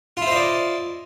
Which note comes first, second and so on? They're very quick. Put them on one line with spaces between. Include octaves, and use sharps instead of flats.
F4 E4 C5 D#5 D5